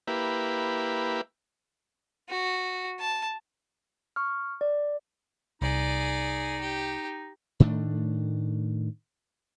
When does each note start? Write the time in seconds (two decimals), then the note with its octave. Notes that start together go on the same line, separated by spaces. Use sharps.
0.07 A#3 E4 G4 B4
2.29 F#4
2.99 A5
4.16 C#6 F6
4.61 D5
5.62 C2 D#4 G#4 D5
6.61 G4
7.60 A2 D#3 A3 D4